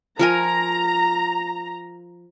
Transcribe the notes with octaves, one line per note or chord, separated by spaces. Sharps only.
F3 A#4 G#5 A#5